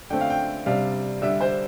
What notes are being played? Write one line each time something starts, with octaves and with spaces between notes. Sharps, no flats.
D3 A3 C4 G5
F5
G5
C3 G3 D4 F5
D3 G3 D4 E5
C5